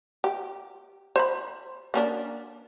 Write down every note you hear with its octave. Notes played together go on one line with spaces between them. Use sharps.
G4
C5 B5
A#3 C#4 D4